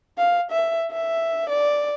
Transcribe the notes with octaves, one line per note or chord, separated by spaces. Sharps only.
F5
E5
E5
D5